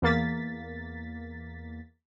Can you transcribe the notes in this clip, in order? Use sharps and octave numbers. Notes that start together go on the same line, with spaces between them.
E2 A#3 A6 B6